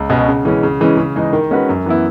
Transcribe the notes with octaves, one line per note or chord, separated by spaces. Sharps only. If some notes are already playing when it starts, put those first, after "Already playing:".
Already playing: C#2
B2 G#3 C#4 G#4
C#3
E3 G#3 C#4
C#3
E3 G#3 C#4
C#3
E3 G#3 D#4 G#4
D#3
G#3 C#4 F#4 B4
F#2
E3 B3 E4